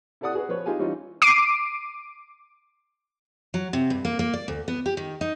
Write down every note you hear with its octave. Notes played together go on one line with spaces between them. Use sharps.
E4 G4 A4 D5 F#5 D#6
F#4 G#4 B4
F3 B4 C#5
D#4 F4 G4 G#4 G#5
E3 G3 C#4 D#4 F4
D6 C7 D7 D#7
F#3
C3
G2
A#3
A#3
D5
D2
B3
G4
D#3
D#4